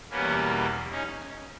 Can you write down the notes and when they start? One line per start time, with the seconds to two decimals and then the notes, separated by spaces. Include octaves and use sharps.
0.10 E2 B2 G3 A#3 B3 C#4
0.90 C#4 D#4